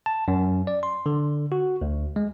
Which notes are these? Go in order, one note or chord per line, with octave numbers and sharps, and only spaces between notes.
A5
F#2
D5
C6
D3
F#4
D2
G#3